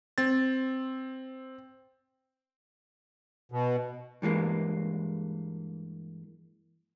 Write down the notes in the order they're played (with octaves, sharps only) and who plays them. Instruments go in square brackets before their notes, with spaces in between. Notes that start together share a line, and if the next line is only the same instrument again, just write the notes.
[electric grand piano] C4 A6
[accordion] B2
[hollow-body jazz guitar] G2 E3 G#3 A#3